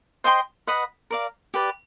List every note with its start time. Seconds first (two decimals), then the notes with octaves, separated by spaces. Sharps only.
0.24 C5 D#5 G5 C6
0.67 B4 D#5 F#5 B5
1.11 A#4 D5 F5
1.54 G4 B4 D5